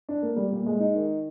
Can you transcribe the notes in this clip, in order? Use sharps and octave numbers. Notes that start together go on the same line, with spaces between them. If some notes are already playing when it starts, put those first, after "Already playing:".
D4
A#3
G3
A#2
G#3
D#4
D#3